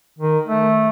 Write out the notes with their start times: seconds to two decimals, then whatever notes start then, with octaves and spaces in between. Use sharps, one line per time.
0.19 D#3
0.47 A3